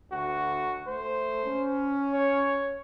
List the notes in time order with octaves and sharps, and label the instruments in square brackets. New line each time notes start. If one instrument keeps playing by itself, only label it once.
[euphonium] D2 [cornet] F#4
[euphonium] A3 [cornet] C5
[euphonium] C#4
[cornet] C#5